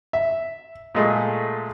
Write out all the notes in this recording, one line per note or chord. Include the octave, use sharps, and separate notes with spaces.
E5
A#2 G#3 A3